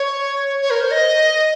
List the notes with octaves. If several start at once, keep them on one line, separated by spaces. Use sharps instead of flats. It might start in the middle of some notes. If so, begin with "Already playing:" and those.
Already playing: C#5
C#5
A#4
C5
D#5